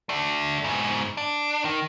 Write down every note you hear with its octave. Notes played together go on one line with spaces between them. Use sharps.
A3 D4
G#2 B2
D4
D#3